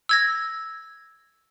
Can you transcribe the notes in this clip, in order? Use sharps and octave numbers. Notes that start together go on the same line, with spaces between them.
E6 G#6 A#6